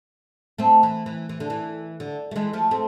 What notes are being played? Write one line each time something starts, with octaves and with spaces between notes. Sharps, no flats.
A3 C4
E3
E3
E3
D3
E3
D3
A3
E3 G#3
F3 A3
A3 C4